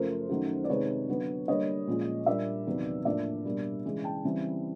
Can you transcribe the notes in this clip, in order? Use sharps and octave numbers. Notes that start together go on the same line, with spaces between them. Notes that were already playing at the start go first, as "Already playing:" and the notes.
Already playing: F#2 C#3 F3 A3 A#4 C5
F#2 D#3 F#3 A3
D5
C3 D#3 G#3 B4 C#5
D3 F#3 B3
D3 G3 A#3 C#5 D#5
A#2 F3 G#3 C#4
A#2 G3 A#3 D4 D5 E5
E2 C3 D#3 F#3 B3
A2 F3 A#3 D4 D5 E5
B2 G3 A#3 D4
C#3 E3 G#3
G5 A5
C#3 E3 G3 C4